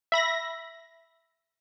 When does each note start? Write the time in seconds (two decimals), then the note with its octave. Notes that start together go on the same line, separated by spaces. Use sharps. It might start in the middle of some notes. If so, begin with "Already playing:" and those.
0.12 E5 B5 A#6